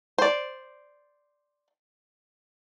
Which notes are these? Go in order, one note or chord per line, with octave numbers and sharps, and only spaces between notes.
C5 D5